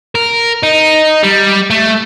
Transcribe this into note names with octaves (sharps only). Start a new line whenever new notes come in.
A#4
D#4
G3
A3